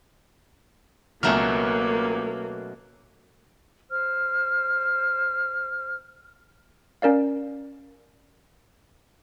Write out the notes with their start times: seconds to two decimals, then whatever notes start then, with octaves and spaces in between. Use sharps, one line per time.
1.23 C#2 B2 F#3 A3 A#3 C#4 A#5 F6
3.90 C5 F6
7.02 C#4 A#4 D5 F5